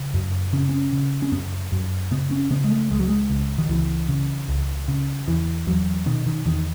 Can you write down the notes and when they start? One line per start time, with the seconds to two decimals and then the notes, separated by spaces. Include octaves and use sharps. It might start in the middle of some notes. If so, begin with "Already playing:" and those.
Already playing: C#3
0.14 F#2
0.53 C#3 C#4
0.69 C#4
0.93 C#3
1.22 C#4
1.32 F#2 B3
1.72 F#2
2.11 C#3 B3
2.31 C#4
2.51 C#3 B3
2.64 G#3
2.70 A3
2.90 C#2 G#3
2.99 F#3
3.08 G#3
3.30 C#2
3.58 D#3
3.69 C#2 E3
4.09 C#3
4.49 C#2
4.88 C#3
5.27 E2 E3
5.67 E2 F#3
6.06 B2 D#3
6.26 D#3
6.46 E2 D#3